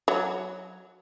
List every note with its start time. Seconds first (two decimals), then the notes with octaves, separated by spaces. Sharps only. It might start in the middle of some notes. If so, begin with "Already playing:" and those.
0.08 F#3